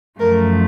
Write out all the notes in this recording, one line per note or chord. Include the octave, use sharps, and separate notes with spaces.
F#2 F3 A3 A#4